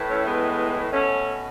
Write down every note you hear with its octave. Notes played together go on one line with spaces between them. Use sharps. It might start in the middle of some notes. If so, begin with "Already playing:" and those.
Already playing: A2 E3
A3 C#4
G#3 B3
B2 A3 C#4